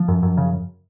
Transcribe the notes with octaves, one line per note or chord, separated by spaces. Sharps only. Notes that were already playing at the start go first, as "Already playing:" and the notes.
Already playing: F3
F#2
F#2
C#3